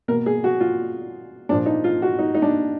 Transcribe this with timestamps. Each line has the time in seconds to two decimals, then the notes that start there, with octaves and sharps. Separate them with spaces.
0.08 B2 A#3 A#4
0.26 G#4
0.44 F#4
0.60 F4
1.49 A#2 F3 A#3 D4
1.66 D#4
1.84 F4
2.02 F#4
2.19 D#4
2.34 D#4
2.42 D4